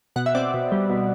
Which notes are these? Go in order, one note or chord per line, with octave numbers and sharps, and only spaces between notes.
B2 F#5
E5
C4 D5
B2
G3
B2